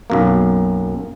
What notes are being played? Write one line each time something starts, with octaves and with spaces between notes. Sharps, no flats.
B1 F#2 A#3